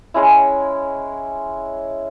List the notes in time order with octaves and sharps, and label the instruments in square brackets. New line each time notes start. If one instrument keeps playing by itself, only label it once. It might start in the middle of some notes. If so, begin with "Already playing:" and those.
[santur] G#3 C#4 E4